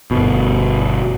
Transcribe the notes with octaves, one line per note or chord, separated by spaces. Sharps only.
G1 B2